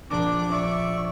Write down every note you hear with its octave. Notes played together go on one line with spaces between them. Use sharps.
A#1 F3 A#3 D4 D6
D5 E5 C#6